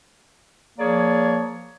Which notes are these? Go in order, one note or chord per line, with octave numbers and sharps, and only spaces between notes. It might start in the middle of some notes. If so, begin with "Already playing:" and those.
F3 A#3 G#4 C#5 D5